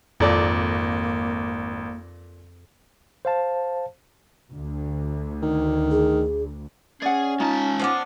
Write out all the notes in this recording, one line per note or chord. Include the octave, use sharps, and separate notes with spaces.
G#1 F2 A#2 A#3 A4 D5
C5 F5 A5
D2
D#3
G#4
C#4 G#4 D5 F#5
G#3 D#4 F4 A5
F3 B3 D4